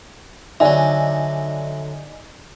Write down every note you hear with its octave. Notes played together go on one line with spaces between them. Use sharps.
D3 F#3 D#4 D5 E5 G#5